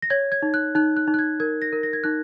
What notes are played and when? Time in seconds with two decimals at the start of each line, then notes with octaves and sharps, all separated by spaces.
0.02 A#6
0.10 C#5 G#6
0.32 G#6
0.42 D#4
0.54 F#6
0.75 D#4 F#6
0.97 F#6
1.08 D#4
1.14 F#6
1.19 G#6
1.40 A#4 G#6
1.62 A#6
1.73 A#4
1.83 A#6
1.93 G#6
2.04 D#4 F#6